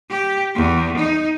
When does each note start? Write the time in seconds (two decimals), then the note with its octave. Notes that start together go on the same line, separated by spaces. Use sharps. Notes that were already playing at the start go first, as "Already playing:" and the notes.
0.10 G4
0.56 E2
0.97 D#4